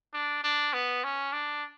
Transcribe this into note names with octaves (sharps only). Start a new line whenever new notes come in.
D4
D4
B3
C#4
D4